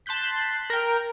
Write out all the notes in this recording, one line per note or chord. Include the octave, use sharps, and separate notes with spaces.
A5 C6 F#6 G6 B6
A#4 G5